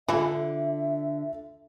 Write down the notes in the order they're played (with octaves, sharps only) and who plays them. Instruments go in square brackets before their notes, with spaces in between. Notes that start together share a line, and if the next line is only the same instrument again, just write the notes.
[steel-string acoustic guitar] D3 [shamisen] E3 E4 [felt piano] F4 A4 [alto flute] E5